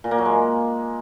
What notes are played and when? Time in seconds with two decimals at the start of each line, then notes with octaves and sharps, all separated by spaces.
0.04 A#2
0.11 A#3
0.18 F#3
0.25 G#3